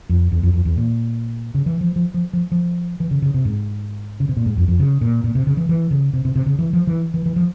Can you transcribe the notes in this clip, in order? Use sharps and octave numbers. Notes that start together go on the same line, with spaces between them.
F2
E2
F2
F2
E2
A#2
C#3
E3
F3
F3
F3
F3
F3
E3
C#3
C#3
C3
G#2
C#3
C3
A#2
G#2
F2
F2
C#3
A#2
A#2
C3
C#3
E3
E3
C#3
C3
C3
C3
C#3
E3
F3
E3
E3
E3
F3